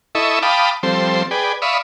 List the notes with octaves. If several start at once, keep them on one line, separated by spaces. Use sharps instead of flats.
E4 A4 D#5 E5 C#6
F5 G5 A5 B5 D6 D#6
F3 G3 C4 A4 C5
G#4 B4 D5 G5
D5 E5 F5 B5 C#6 D#6